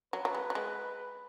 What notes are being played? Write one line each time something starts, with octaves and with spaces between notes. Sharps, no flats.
F#3 B4
F#3
G#3
F#3
G#3